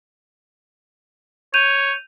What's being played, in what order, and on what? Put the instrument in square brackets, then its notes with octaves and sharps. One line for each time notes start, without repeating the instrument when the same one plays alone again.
[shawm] C#5 [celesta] G6 D#7 F7